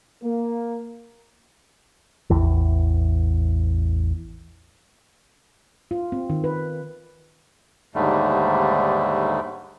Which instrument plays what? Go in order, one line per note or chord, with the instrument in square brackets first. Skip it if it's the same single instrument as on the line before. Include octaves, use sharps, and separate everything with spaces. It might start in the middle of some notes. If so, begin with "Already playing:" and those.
[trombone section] A#3
[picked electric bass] A1 E2 E3
[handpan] F4
C4
D#3
B4
[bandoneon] D#2 G#2 D3 G3 A3